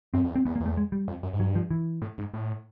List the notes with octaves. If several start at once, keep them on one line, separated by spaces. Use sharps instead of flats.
F#2 C4
F2
E2
C4
E2 B3
A#3
E2
A3
G#3
G3
F2
F#2
G#2
G2 F#3
F3
E3
A2
G#2
A2